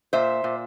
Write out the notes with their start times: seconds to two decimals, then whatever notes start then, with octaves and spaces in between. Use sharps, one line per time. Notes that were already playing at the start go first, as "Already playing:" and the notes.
0.13 A#2 C5 E5
0.44 A#2